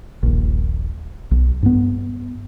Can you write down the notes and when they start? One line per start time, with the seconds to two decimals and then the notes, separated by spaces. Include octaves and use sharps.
0.23 D#1 A#1
1.31 B1
1.63 G2 B3